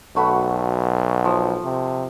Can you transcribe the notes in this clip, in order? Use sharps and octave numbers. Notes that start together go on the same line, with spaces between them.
B1 A3 F#4 B5
F3
C3